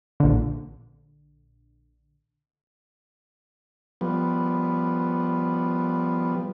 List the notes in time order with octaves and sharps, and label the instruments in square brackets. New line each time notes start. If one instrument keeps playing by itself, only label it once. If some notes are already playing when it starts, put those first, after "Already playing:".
[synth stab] A#1 D3
[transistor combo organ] F3 G3 B3